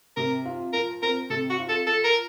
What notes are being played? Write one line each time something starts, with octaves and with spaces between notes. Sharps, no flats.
C3 A#4
F4
F3 A#4
C4 A#4
C3 A4
F#4
F4
A4
F3 A4
A#4